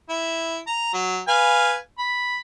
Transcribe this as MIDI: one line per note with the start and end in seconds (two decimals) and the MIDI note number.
0.09 0.58 64
0.67 0.89 82
0.93 1.21 54
1.28 1.77 71
1.28 1.77 77
1.28 1.77 80
1.99 2.37 83